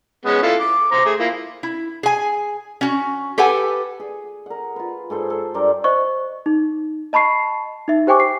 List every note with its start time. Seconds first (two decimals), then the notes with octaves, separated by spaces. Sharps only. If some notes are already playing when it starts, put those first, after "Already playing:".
0.25 G#3 B3 C#4
0.43 E4 F4 A4
0.60 D6
0.92 C5 A#5 D6
1.05 A3 G#4
1.19 A#3 E4 F4
1.63 E4
2.03 G#4 G#5
2.81 C#4 F#4
3.38 G4 A4 B4 F#5 G#5
4.00 G#4
4.46 A#4 F#5
4.76 F4 B4
5.10 G#2 G#4 A4 C5
5.30 A4
5.54 G2 A#4 D5 G5
5.84 C5 D#5 C#6
6.46 D#4
7.13 D#5 A5 B5 C#6 C7
7.88 D#4 E5
8.07 G4 C5 G5 G#5 C#6 D6
8.20 C7